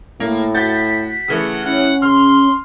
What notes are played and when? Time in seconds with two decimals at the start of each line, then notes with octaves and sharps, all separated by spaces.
0.20 A2 A#3
0.55 F#4 G6 A6 B6
1.28 C#3 E3 A3 F#5
1.65 C#4 E4 F#5
2.02 C#3 C6 F6